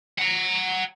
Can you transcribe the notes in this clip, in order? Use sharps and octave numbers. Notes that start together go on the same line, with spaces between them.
F#5 A#5